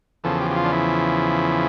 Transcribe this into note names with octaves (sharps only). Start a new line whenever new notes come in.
E2 C#3 F3 A4
G4
G4
F4
D4
E4